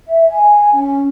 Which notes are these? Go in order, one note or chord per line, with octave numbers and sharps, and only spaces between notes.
E5
G#5
C#4